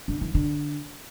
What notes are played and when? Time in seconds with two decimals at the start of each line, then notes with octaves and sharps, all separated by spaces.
0.08 D3
0.21 E3
0.35 D3